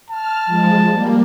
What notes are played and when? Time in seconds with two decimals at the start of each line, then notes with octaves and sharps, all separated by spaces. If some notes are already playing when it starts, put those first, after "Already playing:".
0.10 A5 F6
0.46 F3 G#3
0.88 G3 A#3